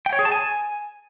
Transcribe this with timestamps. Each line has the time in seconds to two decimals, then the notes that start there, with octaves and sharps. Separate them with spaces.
0.06 G5
0.13 C#5
0.19 G#4
0.25 A5
0.32 G#5